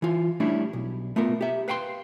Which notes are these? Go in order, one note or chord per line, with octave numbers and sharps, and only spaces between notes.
E3 F4
G3 A3 C#4 D4 E4
B1
A3 B3 F4 A#4
G4 E5
B4 F5 G5 A5 C6